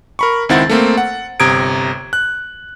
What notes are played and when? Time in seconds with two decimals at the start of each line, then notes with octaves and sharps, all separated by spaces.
0.19 A#4 B5 C#6
0.49 C#2 D#3 C4 E4 F#5 A6
0.69 A3 A#3 C4
0.97 F#5
1.40 G1 C3 A#5 D#6 G#6 D7
2.13 F#6